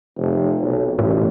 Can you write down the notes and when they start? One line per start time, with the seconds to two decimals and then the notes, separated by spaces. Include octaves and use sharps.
0.17 F1
0.63 B1
0.99 A1 A2